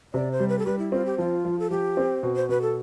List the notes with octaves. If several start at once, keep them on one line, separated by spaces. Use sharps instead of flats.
C3 D5
C5
G3
B4
A4
G3 B4
E4
C4 F4
G4
F3 F4
F3
A4
F3 G4
C4
B2
C5
B2 B4
A4